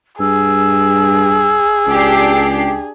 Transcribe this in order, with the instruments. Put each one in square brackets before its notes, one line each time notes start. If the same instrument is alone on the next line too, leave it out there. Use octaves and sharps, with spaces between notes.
[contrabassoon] G2 [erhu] G#4 [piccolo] E6
[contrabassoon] C#2 [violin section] D4 G4 C7